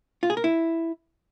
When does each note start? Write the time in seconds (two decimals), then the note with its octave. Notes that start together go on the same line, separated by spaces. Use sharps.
0.23 F4
0.30 G#4
0.37 A#4
0.44 E4